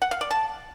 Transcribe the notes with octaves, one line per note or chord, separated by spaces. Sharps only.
F#5
F5
D5
A5